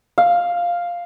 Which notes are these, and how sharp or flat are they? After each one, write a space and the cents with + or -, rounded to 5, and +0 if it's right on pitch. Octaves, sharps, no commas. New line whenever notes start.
F5 +0